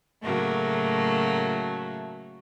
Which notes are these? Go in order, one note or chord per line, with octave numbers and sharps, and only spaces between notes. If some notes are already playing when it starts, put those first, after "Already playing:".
A2 C#3 F#3 A3 A#3